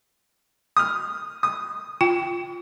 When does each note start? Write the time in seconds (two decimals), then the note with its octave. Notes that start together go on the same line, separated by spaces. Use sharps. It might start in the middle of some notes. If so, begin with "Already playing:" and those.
0.77 D#6 F6
1.43 D#6
2.01 F4 G5